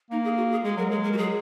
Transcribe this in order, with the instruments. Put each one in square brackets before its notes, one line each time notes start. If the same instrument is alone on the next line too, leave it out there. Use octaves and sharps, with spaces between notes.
[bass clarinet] A#3 [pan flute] D#4
[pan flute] G#4
F#4
G#4
[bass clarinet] G#3 [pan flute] G#4
[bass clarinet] F#3 [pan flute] A#4
[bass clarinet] G#3 [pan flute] G#4
[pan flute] A#4
F#4
[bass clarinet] F#3 [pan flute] G#4